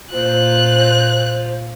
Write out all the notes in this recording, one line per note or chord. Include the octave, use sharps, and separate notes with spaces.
A#2 F4 C5 F#6